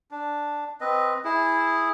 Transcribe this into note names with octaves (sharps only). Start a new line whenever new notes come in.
D4
C4 B4 D#5
E4 G#4